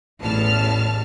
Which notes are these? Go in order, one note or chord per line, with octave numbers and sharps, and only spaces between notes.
A1 E2 A2 A5 F6